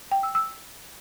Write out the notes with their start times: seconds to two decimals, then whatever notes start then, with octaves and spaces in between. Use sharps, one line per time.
0.12 G5
0.23 E6
0.35 E6